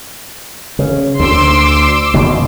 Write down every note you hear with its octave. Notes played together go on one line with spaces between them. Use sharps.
C#3
D2 C6 D6 E6
F#1 B2 D#3